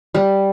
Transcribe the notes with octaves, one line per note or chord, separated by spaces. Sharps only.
G3